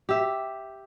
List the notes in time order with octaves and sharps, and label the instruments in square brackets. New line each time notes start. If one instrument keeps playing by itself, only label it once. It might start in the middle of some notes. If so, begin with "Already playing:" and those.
[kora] G4 E5